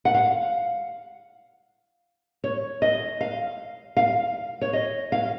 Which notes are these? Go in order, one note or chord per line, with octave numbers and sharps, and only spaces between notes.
F#5
F5
C#5
D#5
F5
F5
C#5
D#5
F5